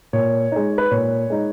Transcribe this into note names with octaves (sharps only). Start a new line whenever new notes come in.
A#2 C#5
G#3 D#4
B4
A#2 C#5
G#3 D#4